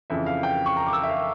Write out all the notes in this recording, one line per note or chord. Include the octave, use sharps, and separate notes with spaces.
F2 C#3 E3 E5
F5
G5
C#6
A#5
D6
E6
E5
F5